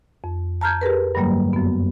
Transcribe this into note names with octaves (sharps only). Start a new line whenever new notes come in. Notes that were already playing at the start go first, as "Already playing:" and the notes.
F2
A5 A#5 F6 G6 G#6
G4 G#4 A#4 B4
G2 D3 F#3 G3 A#3
F#2 B3